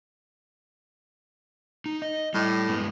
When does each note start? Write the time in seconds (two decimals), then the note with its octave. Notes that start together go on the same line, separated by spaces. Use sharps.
1.86 D#4
2.02 D#5
2.34 A2 G3
2.69 G2 G#3 B3